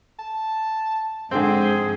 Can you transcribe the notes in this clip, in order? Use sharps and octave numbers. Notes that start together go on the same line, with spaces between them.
A5
G#2 D3 F3 C4 G#4 C5